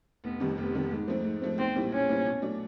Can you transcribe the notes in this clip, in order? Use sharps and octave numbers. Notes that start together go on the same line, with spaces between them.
F1 B3
F2 C3 D#3 G3
F1 B3
F2 C3 D#3 G3
G#2
F3 A3 C4
G#2
F3 A3 C4
B1 C4
A#2 G3 C4 E4
B1 C#4
A#2 G3 C4 E4
B2
F#3 A3 D4